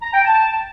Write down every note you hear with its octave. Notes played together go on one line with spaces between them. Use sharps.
A#5
G5
A5